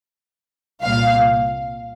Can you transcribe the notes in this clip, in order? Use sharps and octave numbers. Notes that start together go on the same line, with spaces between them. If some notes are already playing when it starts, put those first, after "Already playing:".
C2 A#2 F5